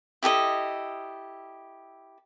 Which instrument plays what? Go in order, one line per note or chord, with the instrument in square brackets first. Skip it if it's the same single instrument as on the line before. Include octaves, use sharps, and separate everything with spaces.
[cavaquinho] E4 G4 A4 D#5